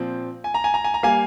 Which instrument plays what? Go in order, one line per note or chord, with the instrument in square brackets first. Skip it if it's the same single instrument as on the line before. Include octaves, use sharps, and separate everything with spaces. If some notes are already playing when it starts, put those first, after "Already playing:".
Already playing: [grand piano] A#2 F3 C4
G#5
A#5
G#5
A#5
G#5
A#5
G3 A#3 F5 G#5